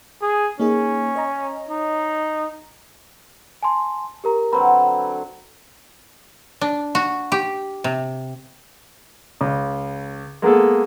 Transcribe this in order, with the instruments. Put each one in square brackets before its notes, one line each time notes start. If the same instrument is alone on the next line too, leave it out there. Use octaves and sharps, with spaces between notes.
[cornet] G#4
[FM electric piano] A#3 D#4 G#4 [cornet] C#4
[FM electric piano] C#5 D#5 A#5
[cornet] D#4
[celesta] G#5 A5 C6
G4 A#4 A#5
[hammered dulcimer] D3 F#3 C4 [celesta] B4 A#5 B5
[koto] D4
F#4
G4
C3
[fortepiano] C#2
G#3 A#3 B3 G#4 A4